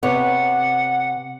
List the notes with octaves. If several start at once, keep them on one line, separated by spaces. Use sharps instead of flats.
C3 B3 C#5 F#5